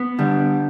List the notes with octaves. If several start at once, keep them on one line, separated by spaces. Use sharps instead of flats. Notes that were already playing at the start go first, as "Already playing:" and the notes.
Already playing: B3
D3 G3